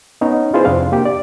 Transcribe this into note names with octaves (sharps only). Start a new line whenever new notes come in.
B3 C#4 D#4 C#5
E4 F4 G#4 B4 C5
F2 C3 C4 D4 F5
A#3 G4
D5